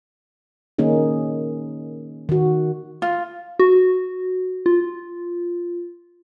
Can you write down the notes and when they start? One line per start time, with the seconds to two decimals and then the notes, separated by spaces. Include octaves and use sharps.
0.78 D#3 A#3 C#4 D#4 G#4
2.29 D#3 F#4
3.02 F4
3.59 F#4
4.66 F4